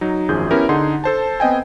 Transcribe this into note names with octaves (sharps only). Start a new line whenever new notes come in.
F#3 D#4
G#1 F#2 F3 G#4 G6
B3 C#4 E4 G4 A#4
D3 D#4 G#4 F#5 C6
A4 C5 A5
B3 C4 D#5 G5 G#5